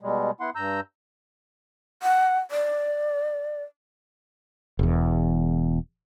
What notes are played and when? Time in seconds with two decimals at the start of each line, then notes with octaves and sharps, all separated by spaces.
0.01 B2 G3 G#3
0.40 B3 E4 F#5 C6
0.56 G2 A#5 E6 G6
2.03 F#5
2.51 D5
4.79 E1 E2